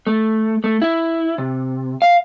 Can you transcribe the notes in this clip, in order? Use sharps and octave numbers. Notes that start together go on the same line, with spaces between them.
A3
A3
E4
C3
F5